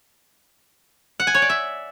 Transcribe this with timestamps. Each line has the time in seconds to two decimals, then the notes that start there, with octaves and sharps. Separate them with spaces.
1.20 F#5
1.27 G#5
1.34 C#5
1.42 D5
1.49 E5